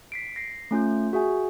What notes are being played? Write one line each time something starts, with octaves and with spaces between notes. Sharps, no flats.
B6 C7 D7
A#6 C7
A3 C#4 F4 G6
F#4 G#4 E5 G#5